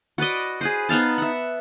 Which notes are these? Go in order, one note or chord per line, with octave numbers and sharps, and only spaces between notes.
F#4 B4 D5 D#5
G#4 B4 C5
B3 D#4 F5 A5
E5 F#5